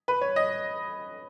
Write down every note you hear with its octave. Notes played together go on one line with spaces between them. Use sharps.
B4
C#5
D#5